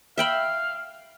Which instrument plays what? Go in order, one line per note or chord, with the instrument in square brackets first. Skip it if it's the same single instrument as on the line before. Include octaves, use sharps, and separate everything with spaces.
[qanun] E5 G5 B5 [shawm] F5